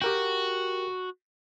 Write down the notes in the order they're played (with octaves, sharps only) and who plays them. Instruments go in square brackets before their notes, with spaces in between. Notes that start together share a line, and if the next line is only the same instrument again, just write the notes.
[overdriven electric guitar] F#4 [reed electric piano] G4 A#4 G5